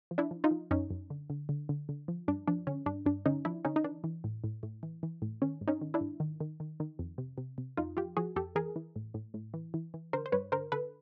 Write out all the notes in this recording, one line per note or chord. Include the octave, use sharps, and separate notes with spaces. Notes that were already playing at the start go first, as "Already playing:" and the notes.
F3
D4 E4
F3
D#4 F4
F3
F#2 C#4 D#4
F#2
D3
D3
D3
D3
D3
F3
G2 D4
F3 D4
D3 C#4
G2 D4
G2 D4
D3 C#4 D#4
F3 D4 E4
D3 C#4 D#4
D#4
E3 D4
E3
A2
A2
A2
E3
E3
A2
D#3 C#4
G#2
C#4 D#4
D#3
D4 E4
G#2
D#3
D#3
D#3
D#3
F2
C3
C3
C3
F2 D#4 F4
F3 F4 G4
F3 F#4 G#4
F2 G4 A4
E3 G#4 A#4
E3
A2
A2
A2
E3
E3
E3
D3 A#4 C5
C5
G2 B4 C#5
D3 A#4 C5
D3 A4 B4